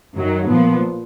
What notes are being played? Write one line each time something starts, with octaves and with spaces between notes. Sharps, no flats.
F#2 D#3 F#3
A#2 F3 B3